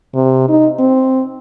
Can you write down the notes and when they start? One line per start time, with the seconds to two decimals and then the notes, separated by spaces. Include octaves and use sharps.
0.15 C3
0.49 D#4
0.79 C4